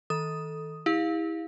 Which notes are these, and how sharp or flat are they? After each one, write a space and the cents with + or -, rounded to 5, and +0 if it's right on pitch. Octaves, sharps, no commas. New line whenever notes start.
D#3 +35 A4 +0 D#6 +0
E4 -25 G4 +40 F5 +0